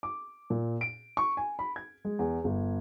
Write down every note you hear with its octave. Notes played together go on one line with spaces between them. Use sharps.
D6
A#2
D7
C#6
G#5
B5
G#6
G#3
E2
G1